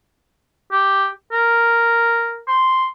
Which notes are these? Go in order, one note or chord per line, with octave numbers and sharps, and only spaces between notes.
G4
A#4
C6